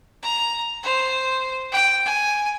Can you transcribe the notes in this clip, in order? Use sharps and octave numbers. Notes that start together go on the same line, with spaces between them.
A#5
C5
G5
G#5